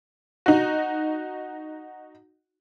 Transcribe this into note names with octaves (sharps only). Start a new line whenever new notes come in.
D#4 F#4